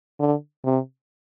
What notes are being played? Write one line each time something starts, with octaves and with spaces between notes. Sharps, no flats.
D3
C3